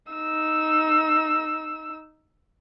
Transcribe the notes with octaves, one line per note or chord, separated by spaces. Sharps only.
D#4 E6